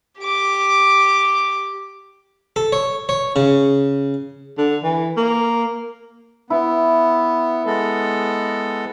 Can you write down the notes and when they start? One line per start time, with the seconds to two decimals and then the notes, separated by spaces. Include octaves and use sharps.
0.19 G4 D6
2.56 A4
2.72 C#5
3.09 C#5
3.36 C#3
4.58 D3
4.84 E3
5.17 A#3
6.50 B3 E4
7.66 G#3 B3 A4